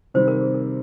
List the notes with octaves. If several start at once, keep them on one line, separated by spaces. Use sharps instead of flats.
C3 D#3 G3 C4 C5
A#4
G#4
A#4